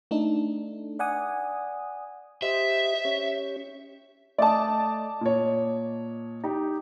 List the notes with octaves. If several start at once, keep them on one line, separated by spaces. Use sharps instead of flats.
A3 D4 D#4 A4
D5 F#5 G#5 D#6
G4 C5 D#5 E5
C#4 G4 C#5
A3 D5 D#5 A5 D#6
A#2 C#5
D#4 G4